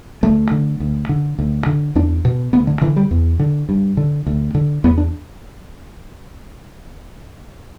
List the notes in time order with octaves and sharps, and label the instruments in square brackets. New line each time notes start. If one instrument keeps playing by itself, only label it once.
[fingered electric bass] D2 A3
D3
D2
D3
D2
D3
E2 D4
B2
D2 B3
D3
D3 E3
G3
E2
D3
G2
D3
D2
D3
E2 B3
D4